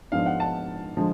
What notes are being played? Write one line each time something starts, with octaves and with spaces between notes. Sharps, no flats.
G#2 F3 G#3 B3 D4 F5
F#5
A5
D3 F3 G#3